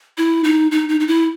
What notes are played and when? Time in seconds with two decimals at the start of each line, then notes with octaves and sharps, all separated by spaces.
0.18 E4
0.44 D#4
0.71 D#4
0.89 D#4
1.00 D#4
1.07 E4